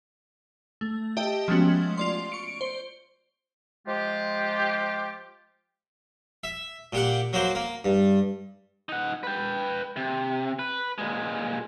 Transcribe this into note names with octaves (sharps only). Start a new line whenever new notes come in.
A3
G4 D#5 E5 G5 A5
F3 G#3 A3 B3 C#4 F#4
F4 D5 C6
C#6 C#7 D7
C5
F3 G#3 F4 G4
E5
A#2 G4 F#5
F#3 A#3 C5
A#3
G2
D#4 F#5
B4 G5
C3
B4
A#2 G#3